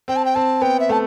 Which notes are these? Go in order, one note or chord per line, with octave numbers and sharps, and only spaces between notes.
C4 G5
A5
G5
C4 A5
B3 G5
E5
A3 A5